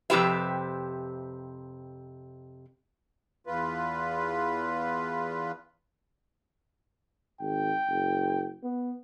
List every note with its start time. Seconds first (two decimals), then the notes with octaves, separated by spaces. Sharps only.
0.10 F2 C3 E3 G4 B4 E5
3.47 E2 F4 B4
7.41 G#1 G5
7.88 F#1
8.63 B3